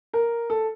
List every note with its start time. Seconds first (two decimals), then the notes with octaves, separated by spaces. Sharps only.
0.13 A#4
0.50 A4